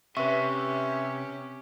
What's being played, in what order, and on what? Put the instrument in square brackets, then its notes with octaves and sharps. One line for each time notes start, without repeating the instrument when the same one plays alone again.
[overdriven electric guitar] C3 [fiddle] C#4 G4 [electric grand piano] B4 E5 [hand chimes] C#6